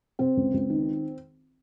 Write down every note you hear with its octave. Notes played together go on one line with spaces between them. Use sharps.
C3 C4
C#2
C#2
D#3